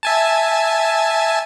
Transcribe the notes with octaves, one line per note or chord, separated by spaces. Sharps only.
E5 G#5 A5